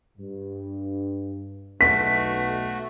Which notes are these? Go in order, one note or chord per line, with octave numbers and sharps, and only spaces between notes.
G2
B1 B2 A3 F#4 B6